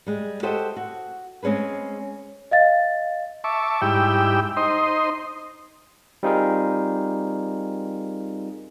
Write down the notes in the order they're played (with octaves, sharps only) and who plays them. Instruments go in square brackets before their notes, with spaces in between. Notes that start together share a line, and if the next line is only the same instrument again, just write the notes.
[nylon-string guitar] G3 G#3
F#4 G4 A4 C5 D#5 E5
F#4
G#3 C4 C#4 G#4 B4
[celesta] D#5 F5 A6
[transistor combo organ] E5 A5 C#6 D6
G#2 G3 E4 G4 G5 E6
D#4 C5 D#5 C6
[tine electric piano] G3 C4 D#4 F4 G#4 A#4